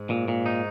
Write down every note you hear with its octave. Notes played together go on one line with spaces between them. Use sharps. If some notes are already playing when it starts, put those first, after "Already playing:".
Already playing: G#2
A#2
A#2
D#4